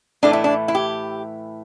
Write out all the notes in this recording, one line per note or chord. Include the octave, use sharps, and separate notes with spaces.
A2 E3 A3 D4
E4
D4
E4
G4